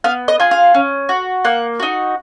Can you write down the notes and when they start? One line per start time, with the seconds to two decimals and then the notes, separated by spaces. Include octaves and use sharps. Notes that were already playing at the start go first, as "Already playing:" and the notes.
0.04 B3 F5
0.28 D#5
0.40 F4 G#4
0.51 F5
0.74 C#4
1.09 F#4
1.44 A#3 F#5
1.80 D#4 F#4